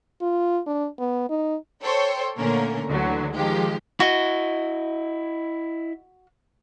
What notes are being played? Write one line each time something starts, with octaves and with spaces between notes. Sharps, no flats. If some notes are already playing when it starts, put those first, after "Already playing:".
F4
D4
B3
D#4
A4 C5 C#5 G5
A#2 D3 A3 A#3 C#4 A#4
D2 D3 E3 F#3
D#3 F3 G#3 G4
E4 F#4 D#5